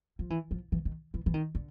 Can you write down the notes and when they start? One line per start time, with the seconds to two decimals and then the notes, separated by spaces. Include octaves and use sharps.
0.19 F3
0.30 E3
0.51 F3
0.72 E3
0.85 D#3
1.14 E3
1.26 E3
1.34 D#3
1.55 D3